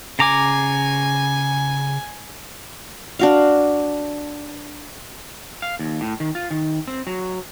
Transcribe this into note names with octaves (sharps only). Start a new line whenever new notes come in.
C#3 G#5 A#5 D6
D4 F#4 F5
F5
D#2
A2
D#3
F4
D#3
C4
F#3